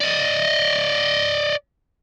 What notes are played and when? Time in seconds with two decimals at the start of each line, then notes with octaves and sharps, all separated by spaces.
0.01 D5 D#5